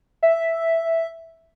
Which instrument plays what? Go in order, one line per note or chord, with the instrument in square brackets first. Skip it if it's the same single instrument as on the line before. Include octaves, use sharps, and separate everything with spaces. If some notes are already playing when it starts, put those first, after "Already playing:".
[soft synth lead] E5